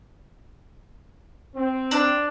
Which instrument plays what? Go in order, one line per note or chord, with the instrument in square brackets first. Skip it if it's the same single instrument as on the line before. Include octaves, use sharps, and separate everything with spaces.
[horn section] C4
[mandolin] D4